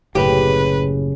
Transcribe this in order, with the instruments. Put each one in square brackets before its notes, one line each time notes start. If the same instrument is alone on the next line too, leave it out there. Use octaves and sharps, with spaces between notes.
[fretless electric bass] F#1 A2 [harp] C#3 [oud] G4 [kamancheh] B4